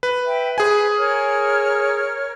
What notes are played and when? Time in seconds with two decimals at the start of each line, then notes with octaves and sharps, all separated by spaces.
0.03 B4
0.24 E5 G5
0.58 G#4 B4 C5 G#5
0.96 A#4 C#5 F6